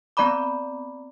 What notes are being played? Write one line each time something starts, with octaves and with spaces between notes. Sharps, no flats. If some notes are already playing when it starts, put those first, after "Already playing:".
B3 C4 D5 A#5 B5 D6